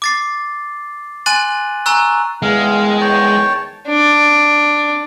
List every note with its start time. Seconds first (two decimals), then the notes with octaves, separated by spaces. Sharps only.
0.02 D6 A6 C7
1.26 G#5 C6 F#6 A6 D#7 F#7
1.86 G#5 A#5 C#6 E6 F#6
2.42 E2 D#3 G#3 F5
3.01 C#5 G5 A5
3.88 D4